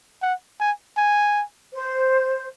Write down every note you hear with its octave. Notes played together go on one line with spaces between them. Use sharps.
F#5
G#5
G#5
C5